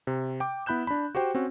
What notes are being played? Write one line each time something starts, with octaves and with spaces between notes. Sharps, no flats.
C3
G5 D6
B3 E4 B5 F#6 G6 E7
D4 B5
F#4 G4 C5 G5
C4 C#4 F#4